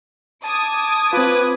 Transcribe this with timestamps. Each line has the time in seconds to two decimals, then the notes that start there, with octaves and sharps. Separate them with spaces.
0.44 A5 D6 D#6 G#6
1.13 C4 F4 B4